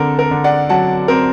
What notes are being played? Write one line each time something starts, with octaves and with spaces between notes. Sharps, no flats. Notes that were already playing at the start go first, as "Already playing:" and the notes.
Already playing: D3 C4 A4 A#4
A#4
D3
D5 F#5
F#3 F#5 A5
C4 A#4